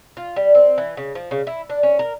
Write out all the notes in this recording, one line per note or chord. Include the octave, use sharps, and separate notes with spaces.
F4
G3
C4
E3
C#3
F3
C#3
E4
D4
C#4
A#4